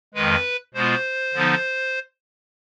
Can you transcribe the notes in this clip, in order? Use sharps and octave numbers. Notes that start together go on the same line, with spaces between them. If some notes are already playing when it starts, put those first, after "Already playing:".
F2 D#3 G#3 B4
B2 G#3 B3 F4 C5
D3 F3 B3 D#4